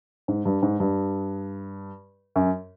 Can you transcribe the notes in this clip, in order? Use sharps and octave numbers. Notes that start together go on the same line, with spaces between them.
G#2
G2
G#2
G2
F#2